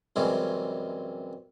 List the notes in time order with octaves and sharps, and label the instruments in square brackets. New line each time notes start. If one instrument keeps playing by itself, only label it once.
[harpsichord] F#2 C3 E3 G3 G#3 C#4